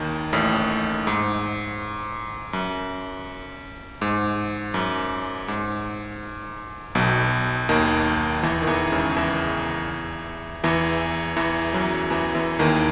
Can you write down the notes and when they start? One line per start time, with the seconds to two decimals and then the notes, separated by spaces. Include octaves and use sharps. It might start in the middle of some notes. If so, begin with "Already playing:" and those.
Already playing: D#2 D#3
0.33 A1 A2
1.07 G#2
2.53 F#2
4.02 G#2
4.74 F#2
5.48 G#2
6.95 B1 B2
7.69 D#2 D#3
8.43 E2 E3
8.62 D#3
8.67 E2 E3
8.92 C#2 C#3
9.16 E2 E3
10.64 E2 E3
11.36 E2 E3
11.73 F#2 F#3
12.10 E2 E3
12.35 E2 E3
12.59 D#2 D#3